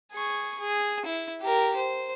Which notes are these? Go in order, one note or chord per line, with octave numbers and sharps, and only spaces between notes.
G#4 C#6
G#4
E4
G4 A#4
C5